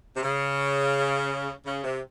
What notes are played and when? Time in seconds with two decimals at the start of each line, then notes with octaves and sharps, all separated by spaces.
0.17 C3
0.23 C#3
1.66 C#3
1.84 C3